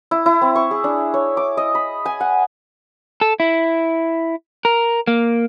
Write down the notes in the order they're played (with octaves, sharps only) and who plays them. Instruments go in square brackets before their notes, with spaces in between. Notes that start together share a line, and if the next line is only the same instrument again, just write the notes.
[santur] E4
E4
C4
C#6
G#4
D4
C#5
D6
D#5
B5
G#5
F#5
[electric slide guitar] A4
E4
A#4
A#3